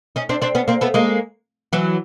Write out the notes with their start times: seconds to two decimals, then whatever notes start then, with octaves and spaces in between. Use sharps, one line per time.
0.16 C#4 D#4
0.29 C4 D4
0.42 C4 D4
0.55 B3 C#4
0.68 A#3 C4
0.81 A3 B3
0.94 G#3 A#3
1.73 E3 F#3